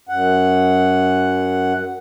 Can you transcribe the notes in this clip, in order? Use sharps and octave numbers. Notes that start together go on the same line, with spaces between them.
F#2 F#5